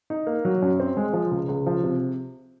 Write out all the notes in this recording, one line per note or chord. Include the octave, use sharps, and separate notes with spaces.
D#4
A#3
F#3
F#2
C4
G#3
F3
C#2
C#2
F3
C3